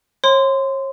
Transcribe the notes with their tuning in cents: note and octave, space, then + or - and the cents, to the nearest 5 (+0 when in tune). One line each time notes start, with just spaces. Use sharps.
C#5 -40 C6 -20